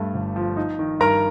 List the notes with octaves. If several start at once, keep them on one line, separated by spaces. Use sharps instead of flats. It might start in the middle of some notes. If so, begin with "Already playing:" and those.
Already playing: G2 G3 A3
G1
F3
D#4
D#3
G2 A#4 A#5